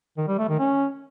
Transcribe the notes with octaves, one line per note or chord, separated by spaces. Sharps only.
D#3
G3
A3
D#3
C#4